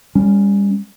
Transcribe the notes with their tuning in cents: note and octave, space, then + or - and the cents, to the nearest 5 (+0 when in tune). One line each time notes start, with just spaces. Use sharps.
G3 +35 C#4 +0